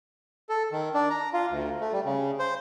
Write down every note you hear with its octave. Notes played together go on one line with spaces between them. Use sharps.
A4
D#3
D4
A#5
F4
D2
A3
G3
C#3
C5